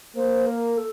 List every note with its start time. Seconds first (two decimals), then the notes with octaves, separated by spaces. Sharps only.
0.16 A#3 C5
0.47 A#4
0.77 A4